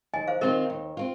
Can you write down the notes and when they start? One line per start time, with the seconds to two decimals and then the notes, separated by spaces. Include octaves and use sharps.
0.14 D#2 D#5 G#5
0.27 C5 F5
0.41 D#3 C4 F4 A#4 D#5
0.70 D#2
0.97 C4 F4